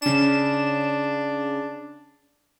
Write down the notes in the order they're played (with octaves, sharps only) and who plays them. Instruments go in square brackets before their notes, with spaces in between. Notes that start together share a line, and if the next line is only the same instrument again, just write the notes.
[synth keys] C#3 E7 [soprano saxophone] D4